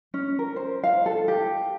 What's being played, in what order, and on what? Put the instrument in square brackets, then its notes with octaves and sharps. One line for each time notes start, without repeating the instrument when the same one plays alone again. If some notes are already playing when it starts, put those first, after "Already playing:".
[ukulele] C#4
A#4
C5
F5
A4
G4